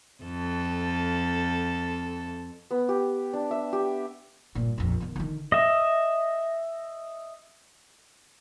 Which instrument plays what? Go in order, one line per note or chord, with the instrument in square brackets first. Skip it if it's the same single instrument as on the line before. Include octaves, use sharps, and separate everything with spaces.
[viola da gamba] F2 A4
[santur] B3
G4
D4
E5
G4
[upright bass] G2 A#2
A#1 F2
D#3 B3
D3 D#3
[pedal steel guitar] D#5 E5